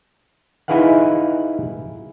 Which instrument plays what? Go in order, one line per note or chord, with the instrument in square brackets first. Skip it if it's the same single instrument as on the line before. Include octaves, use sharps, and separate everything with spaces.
[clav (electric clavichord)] D#4 E4 G#4 B4 F5 F#5